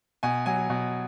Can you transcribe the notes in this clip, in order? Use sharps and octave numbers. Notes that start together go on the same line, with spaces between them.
B2 G#5
F#3 G#5
B2